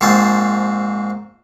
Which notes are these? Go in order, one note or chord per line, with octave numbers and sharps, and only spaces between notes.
A#1 G#2 C4 A5